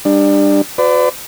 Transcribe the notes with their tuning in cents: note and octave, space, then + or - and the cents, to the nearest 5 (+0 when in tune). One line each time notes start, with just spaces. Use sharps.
G3 +20 D4 +25
F#4 -35 B4 +40 D5 +0